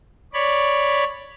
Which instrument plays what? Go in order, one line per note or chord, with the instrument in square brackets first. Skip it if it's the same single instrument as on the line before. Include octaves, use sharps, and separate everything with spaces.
[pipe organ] C#5 D5 B5